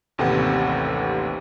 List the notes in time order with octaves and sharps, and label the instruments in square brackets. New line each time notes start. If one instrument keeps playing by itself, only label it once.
[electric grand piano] A1 D#2 C3 A4 B4 F#5